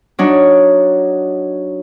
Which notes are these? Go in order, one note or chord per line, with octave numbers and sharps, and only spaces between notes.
F#3 D4 D#4 F#4